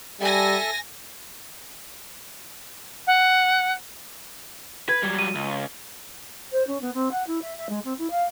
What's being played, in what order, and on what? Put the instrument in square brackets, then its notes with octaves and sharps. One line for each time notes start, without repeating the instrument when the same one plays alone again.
[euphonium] G3 [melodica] A4 E5 A5 [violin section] G#5 A#6
[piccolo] F#5
[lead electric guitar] B4 [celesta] G#6
[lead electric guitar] F#3 G3
[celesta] D#7
[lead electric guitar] C#2
[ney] C5
C#4
B3
C4
F#5
E4
E5
E5
G#3
C4
E4
F5